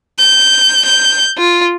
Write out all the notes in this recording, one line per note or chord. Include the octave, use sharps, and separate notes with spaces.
G6
G6
F4